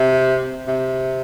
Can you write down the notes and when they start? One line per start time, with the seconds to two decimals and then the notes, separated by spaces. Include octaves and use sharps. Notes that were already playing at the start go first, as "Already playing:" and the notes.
Already playing: C3
0.68 C3